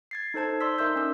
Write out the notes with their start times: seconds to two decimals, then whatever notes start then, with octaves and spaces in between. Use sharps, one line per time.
0.11 G#6 A6 C7
0.34 D#4 A4 C5 A5 G#6
0.61 D5 C6 D#6 E6 B6
0.78 D#4 A#4 E5 C6 E6 G6
0.96 C#4 E6